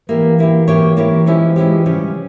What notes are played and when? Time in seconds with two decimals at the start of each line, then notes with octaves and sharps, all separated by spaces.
0.09 E3 A#3 E4 G4
0.39 A#3 E4 G4
0.68 A#3 E4 G4 C#5
0.97 E3 A#3 E4 G4 C#5
1.26 F3 G#3 C#4 E4 G4
1.56 F3 G#3 C#4 E4 G4
1.86 C#3 F3 G3 C#4 G4